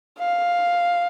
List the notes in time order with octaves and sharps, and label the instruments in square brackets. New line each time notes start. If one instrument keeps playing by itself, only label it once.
[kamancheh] F5